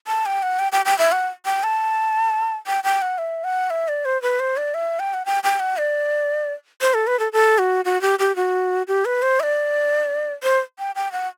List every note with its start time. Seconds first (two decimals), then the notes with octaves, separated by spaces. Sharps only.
0.08 A5
0.26 G5
0.43 F#5
0.59 G5
0.72 G5
0.86 G5
0.99 E5
1.12 F#5
1.46 G5
1.63 A5
2.67 G5
2.84 G5
3.02 F#5
3.18 E5
3.44 F#5
3.70 E5
3.88 D5
4.05 C5
4.22 B4
4.40 C5
4.57 D5
4.74 E5
5.00 G5
5.14 F#5
5.26 G5
5.44 G5
5.60 F#5
5.77 D5
6.81 C5
6.94 A4
7.07 B4
7.19 A4
7.33 A4
7.59 F#4
7.85 F#4
8.01 G4
8.19 G4
8.36 F#4
8.88 G4
9.05 B4
9.22 C5
9.40 E5
9.43 D5
10.43 C5
10.79 G5
10.95 G5
11.12 F#5